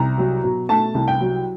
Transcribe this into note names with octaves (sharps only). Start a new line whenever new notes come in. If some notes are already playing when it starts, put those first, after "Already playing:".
Already playing: C2 A#5
F#3
B2
A3 A5
C2
G5
F#3